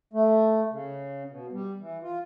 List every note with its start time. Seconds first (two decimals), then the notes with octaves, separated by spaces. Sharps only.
0.13 A3
0.71 C#3
1.30 B2
1.52 G3
1.80 E3
2.02 F4